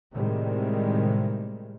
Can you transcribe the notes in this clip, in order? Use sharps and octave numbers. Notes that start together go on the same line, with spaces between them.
A2 C3 D#3 G3 G#3